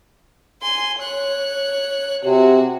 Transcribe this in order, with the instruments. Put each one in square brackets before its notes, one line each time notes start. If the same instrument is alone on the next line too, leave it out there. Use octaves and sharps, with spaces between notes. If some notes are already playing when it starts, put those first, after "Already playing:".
[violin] G#5 C6
C#5 F#6
[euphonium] C3 [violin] F#4 G#4